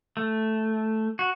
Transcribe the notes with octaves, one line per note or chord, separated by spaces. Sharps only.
A3
F#4